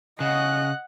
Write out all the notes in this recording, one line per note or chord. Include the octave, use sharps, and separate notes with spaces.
C#3 D#5 F#5 F#6